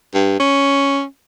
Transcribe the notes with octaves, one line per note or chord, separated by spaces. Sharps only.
G2
C#4